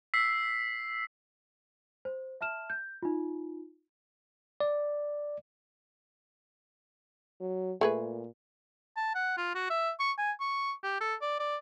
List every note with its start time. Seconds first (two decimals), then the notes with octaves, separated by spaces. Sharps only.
0.14 E6 B6 C7
2.05 C5
2.41 E5 A5 F6 E7
2.70 G6
3.02 D#4 F4
4.60 D5
7.41 F#3
7.81 A#2 A3 G#4 B4
8.97 A5
9.15 F#5
9.38 F4
9.55 F#4
9.70 E5
10.00 C#6
10.18 G#5
10.40 C#6
10.83 G4
11.01 A4
11.21 D5
11.40 D5